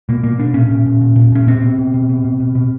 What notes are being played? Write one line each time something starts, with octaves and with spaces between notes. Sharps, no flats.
B2 A#3
B2 A#3
B2 D4
A#2 C#4
A#2
A#2
A#2
A#2
A#2 C#4
B2 C4
B2
B2
B2
B2
B2
B2
B2